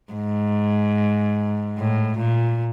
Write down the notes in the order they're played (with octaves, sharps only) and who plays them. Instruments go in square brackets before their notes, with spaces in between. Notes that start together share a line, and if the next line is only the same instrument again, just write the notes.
[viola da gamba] G#2
A2
A#2